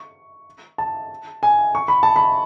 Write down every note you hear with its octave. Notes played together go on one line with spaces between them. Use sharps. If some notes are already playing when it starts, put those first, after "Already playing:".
Already playing: C#6
A5
G#5
C#6
B5
A5
B5